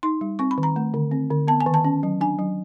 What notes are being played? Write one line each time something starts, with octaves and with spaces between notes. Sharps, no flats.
D#4 C6
G3
C4 C#6
B5
D#3
A#5
A3
D3
C4
D3
B3 A5
G#5
D#3
A5
C#4
F#3
D4 G#5
F#3